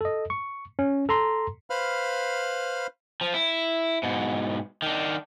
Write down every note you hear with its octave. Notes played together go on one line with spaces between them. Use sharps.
A4 D#5
C#6
C#4
A4 A#5 C6
B4 C5 F5 B5 F6
F3
E4
G#2 B2
D#3 D4